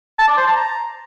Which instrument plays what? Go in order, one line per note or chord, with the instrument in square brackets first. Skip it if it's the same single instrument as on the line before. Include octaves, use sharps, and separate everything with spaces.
[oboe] A5
D5
C5
A5
A#5